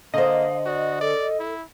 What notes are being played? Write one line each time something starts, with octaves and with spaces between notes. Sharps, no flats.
D3 A#3 C5 D#5 F5
F#4 D5
A4 D5
E4